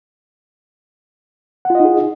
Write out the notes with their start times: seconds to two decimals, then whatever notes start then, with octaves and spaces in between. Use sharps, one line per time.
1.65 F#5
1.70 F4
1.75 D#5
1.80 D#4
1.85 G#4